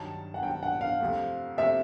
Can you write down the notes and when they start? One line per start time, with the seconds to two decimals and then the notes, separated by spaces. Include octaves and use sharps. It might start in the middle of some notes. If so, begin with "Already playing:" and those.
Already playing: G2 D#3 F#3 A5
0.34 F#5
0.43 G2 D#3 F#3 G5
0.63 F#5
0.81 F5
1.00 F2 C3 F3 A3
1.57 F2 C3 F3 A3 E5